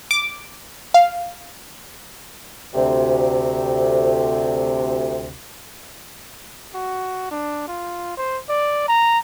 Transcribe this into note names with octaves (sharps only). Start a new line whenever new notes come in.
D6
F5
D2 C3
F#4
D4
F4
C5
D5
A#5